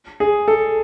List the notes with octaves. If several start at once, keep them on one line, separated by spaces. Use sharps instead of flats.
G#4
A4